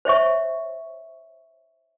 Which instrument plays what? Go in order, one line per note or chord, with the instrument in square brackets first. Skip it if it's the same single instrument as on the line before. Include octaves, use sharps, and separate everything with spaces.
[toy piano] C5 C#5 E5 C#6